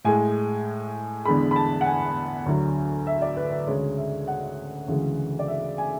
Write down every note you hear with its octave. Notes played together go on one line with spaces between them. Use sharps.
A2 G#3 G#5
E2 D3 G#3 B5
B5
A5
F#5
G#5
D2 D3 F#3
E5
D5
B4
B4
D2 C#3 G#3 C#5
E5
F#5
D2 C#3 E3 G#3
D5
E5
G#5